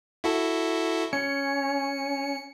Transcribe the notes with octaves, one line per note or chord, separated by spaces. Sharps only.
E4 F#4 A4
C#4 C#7